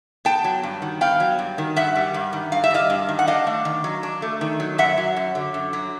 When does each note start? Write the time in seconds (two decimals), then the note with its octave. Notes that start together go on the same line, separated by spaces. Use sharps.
0.25 B3 G5 A5
0.44 F#3
0.63 G2
0.82 D#3
1.01 B3 F5 G5
1.20 F#3
1.39 G2
1.58 D#3
1.76 G2 E5 F#5
1.96 G3
2.14 G2
2.33 D#3
2.52 G2 F5
2.64 E5
2.71 G3 D#5 F5
2.90 G2
3.09 D#3
3.19 F#5
3.27 D4 D#5 F5
3.47 A3
3.65 D#3
3.84 F#3
4.03 D4
4.22 A3
4.41 D#3
4.60 F#3
4.78 F#2 E5 F#5
4.98 F#3
5.17 F#2
5.35 D3
5.54 F#2
5.73 F#3